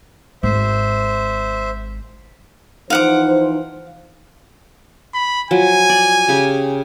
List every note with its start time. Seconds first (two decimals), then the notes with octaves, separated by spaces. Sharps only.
0.43 G#1 C5 E5
2.90 E3 F3 D#4 C5 F5 F#5 D6
5.14 B5
5.51 F3 F#3 G#5
5.89 D5
6.28 C#3 G4